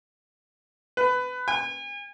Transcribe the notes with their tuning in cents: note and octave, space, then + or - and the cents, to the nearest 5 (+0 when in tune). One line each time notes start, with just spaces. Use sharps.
B4 +20
G#5 -40